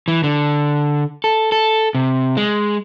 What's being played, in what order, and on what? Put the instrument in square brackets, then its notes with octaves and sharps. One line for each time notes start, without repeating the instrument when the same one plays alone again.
[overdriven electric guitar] E3
D3
A4
A4
C3
G#3